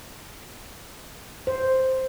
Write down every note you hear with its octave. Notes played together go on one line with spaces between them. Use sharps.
C5